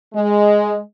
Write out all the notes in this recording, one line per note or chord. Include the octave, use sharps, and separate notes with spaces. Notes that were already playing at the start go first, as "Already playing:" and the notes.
G#3